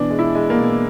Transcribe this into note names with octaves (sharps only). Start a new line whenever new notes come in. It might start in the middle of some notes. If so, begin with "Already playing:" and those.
Already playing: B2 E3 D4
G#3
E4
G#3
A#3
B2